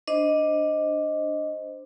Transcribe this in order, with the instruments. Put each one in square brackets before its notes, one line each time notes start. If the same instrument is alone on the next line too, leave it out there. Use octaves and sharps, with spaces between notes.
[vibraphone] D4 C5 D#5